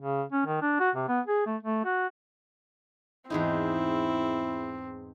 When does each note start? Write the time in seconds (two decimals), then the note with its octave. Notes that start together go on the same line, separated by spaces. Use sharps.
0.01 C#3
0.32 C#4
0.46 D#3
0.62 D4
0.80 F#4
0.95 C3
1.08 B3
1.27 G#4
1.46 A3
1.63 A3
1.85 F#4
3.30 E2 G#2 C4 D#4 E4